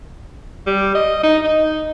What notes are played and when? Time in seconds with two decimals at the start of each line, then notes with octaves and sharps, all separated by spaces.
0.67 G3
0.95 D#5
1.23 D#4
1.44 D#4